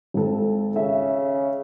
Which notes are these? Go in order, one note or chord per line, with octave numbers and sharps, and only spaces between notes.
G#1 A4
C#3 E5